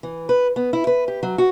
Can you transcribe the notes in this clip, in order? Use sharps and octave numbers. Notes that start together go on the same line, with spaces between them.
E3
B4
B3
E4
B4
G4
F#3
F#4